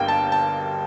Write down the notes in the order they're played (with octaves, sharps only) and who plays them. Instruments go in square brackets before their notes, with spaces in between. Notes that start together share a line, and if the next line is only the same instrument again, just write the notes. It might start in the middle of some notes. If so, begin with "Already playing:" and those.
Already playing: [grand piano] G1 G3 A#3 G5
A5
A5